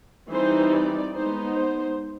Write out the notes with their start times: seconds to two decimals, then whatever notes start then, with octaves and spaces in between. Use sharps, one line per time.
0.30 E3 G3 C4 D#4 C5
0.72 D5
1.14 G#3 B3 D#4 C5
1.56 C5